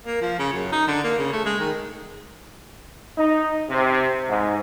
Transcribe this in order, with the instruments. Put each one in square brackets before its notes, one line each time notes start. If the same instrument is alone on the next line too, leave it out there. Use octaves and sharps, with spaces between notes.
[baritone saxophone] A#3
F3
C#3
F#2
D#4
D3
A#3
C#3
A3
G#3
D#3
[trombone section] D#4
C3
G#2